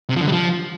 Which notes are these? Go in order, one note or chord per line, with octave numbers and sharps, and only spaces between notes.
C3
F3
D3
G3
F3